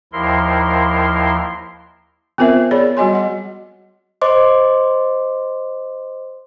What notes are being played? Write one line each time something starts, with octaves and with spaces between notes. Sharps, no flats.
D#2 F3 E4 A#4 C6
B3 C4 F4 A#4 C5 E5
G#4 C#5 D5 B5
G3 F#4 D#5 G#5 C6
D#5 F#5
C5 D#5 C6 D6